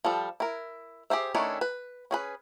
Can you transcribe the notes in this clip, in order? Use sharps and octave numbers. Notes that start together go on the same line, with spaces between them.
F3 G3 A4
E4 A#4
G4 G#4 C5 E5
D#3 A3 C#4 D4 E4
B4
C#4 G#4 B4